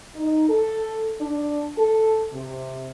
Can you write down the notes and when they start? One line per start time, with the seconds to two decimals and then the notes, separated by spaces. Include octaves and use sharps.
0.15 D#4
0.48 A4
1.20 D4
1.77 A4
2.34 C3